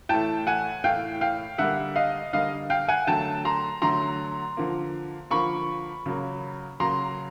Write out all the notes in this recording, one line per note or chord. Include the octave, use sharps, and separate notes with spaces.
A2 E3 A3 G5 A5
F#5 G#5
A2 E3 A3 F5 G5
F5 G5
D3 G3 A#3 E5 F#5
D#5 F5
D3 G3 A#3 D#5 F5
F5 G5
F#5 G#5
D3 F#3 A3 G5 A5
A#5 C6
D3 F#3 A3 A#5 C6
D3 F3 A#3
D3 F3 A#3 B5 C#6
C#3 F#3 A#3
C#3 F#3 A#3 A#5 C6